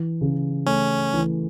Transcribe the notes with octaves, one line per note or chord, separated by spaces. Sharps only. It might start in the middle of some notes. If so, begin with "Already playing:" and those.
Already playing: E3
C#3
A3 C#4
E3